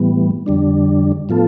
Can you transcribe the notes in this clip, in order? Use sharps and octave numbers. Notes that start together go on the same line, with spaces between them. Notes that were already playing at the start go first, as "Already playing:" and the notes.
Already playing: A2 E3 G3 B3
F2 D3 G3 D4
A2 F3 B3 F4 A4